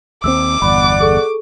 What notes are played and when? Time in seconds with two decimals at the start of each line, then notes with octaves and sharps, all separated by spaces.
0.24 D#2 G#3 C4 D6 E6
0.62 G1 E2 D5 F#5 B5
1.01 G#4 A4 C#6